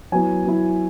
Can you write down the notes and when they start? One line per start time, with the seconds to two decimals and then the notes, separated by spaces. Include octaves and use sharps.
0.12 F#3 B3 E4 G#5
0.45 F#3 B3 E4